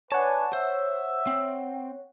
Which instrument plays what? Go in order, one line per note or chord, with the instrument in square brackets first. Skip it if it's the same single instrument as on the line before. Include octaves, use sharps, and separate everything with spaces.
[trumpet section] D4 B4 G#5 [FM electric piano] C#5 F#5 [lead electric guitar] A5
[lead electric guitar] C5 [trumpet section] E5
[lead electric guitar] C4